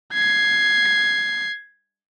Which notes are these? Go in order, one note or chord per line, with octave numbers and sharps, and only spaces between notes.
G#6 C7